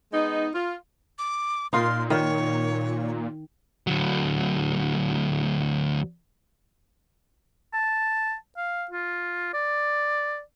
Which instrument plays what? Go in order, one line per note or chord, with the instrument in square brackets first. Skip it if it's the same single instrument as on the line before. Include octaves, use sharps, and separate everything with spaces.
[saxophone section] G#3 B3 D#4
F4
[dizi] D6
[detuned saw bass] A#2 [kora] D#4 F4 A#4 [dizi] C6
[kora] D#3 [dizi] C#5
[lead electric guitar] D2 F#3
[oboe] A5
F5
F4
D5